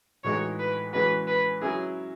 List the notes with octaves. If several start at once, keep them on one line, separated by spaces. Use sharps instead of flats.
A2 E3 G#3 D#4 F#4 C#5
B4
E3 G#3 C#4 F#4 B4
B4
F#3 C#4 E4 G#4